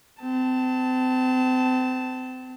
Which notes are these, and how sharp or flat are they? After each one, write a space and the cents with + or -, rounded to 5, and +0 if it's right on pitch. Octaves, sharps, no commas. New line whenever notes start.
C4 -35 A5 +0